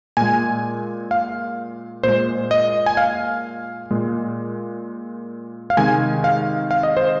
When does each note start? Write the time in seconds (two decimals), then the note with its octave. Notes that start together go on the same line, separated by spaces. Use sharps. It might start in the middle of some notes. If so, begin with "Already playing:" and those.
0.17 A#2 G#3 G#5
1.11 F5
2.03 A#2 G#3 C5
2.51 D#5
2.86 G#5
2.97 F5
3.91 A#2 G#3
5.70 F5
5.77 C3 D#3 G#3 G#5
6.24 F5
6.71 F5
6.83 D#5
6.97 C5